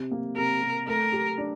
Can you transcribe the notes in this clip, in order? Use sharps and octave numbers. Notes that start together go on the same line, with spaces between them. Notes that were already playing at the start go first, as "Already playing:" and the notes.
Already playing: C3
A#3
C3 A#4
C3
A3 A#4
G4
D4